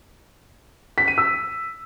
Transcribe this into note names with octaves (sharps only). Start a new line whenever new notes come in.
B6
D#7
E6